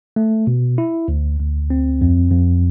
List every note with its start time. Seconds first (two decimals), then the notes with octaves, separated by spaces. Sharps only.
0.16 A3
0.47 B2
0.78 E4
1.08 D2
1.39 D2
1.70 C4
2.01 F2
2.31 F2